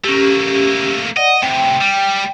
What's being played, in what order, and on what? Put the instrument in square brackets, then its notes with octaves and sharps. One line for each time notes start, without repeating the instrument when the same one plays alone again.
[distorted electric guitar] A3 A#3 [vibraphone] C#4 G4
[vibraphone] D5 F#5 [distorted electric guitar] D#5
[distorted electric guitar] A2 C3 [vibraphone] G5
[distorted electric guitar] G3